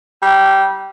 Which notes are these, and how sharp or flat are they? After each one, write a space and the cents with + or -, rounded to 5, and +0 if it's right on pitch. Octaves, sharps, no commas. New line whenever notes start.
G3 -15